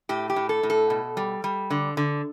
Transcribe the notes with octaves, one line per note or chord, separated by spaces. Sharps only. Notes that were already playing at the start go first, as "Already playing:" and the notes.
A2 G4
G4
A2
A4
A2
A4
B2
G3
G3
D3
D3